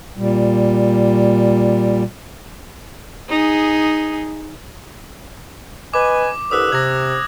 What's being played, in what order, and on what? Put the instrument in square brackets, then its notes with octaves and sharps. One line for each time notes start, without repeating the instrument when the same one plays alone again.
[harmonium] A#2 G3
[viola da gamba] D#4 G#4
[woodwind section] B4 D#5 G#5 [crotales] D6
[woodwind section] C2 D3 B4 [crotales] D#6 E6 F#6
[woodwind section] C3 [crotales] G#6 A#6